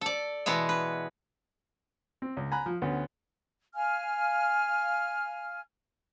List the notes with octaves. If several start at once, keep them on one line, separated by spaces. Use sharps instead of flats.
A4 D5
B2 E3 G#3 B3 E5
B4
C4
C#2
G#5 A#5 B5 F#6
F3
D2 B3 C#4
F5 G#5 F6